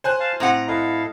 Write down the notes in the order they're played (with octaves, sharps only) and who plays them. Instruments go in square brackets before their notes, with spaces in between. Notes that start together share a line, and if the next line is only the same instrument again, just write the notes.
[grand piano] C5 G#5 F#6
[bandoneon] F5 A5
[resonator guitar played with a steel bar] A2 C4 F#5 [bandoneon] A#5
[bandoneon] E4 A4 F5 [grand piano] D#5